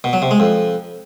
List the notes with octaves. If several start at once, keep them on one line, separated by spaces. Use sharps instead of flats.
B2
F#3
C3
G#3
F2